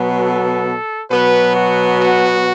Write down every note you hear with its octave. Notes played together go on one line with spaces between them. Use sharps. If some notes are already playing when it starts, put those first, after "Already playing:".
Already playing: B2 F#3 B3
A4
B2 F#3 B3 B4
F#4
F#4